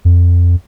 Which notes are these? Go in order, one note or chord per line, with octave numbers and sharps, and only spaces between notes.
F2